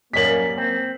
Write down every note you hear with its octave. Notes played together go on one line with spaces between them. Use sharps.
F#2 G3 A#3 A#4 C#5 D#5 B6 F#7
C4